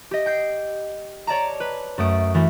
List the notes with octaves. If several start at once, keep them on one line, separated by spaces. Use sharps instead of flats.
G4 D#5
G5 G6 C7
C#5 D5 A5 A#5
B4
F#2 A3 D#6 D7
E3 A3 C#4 F#4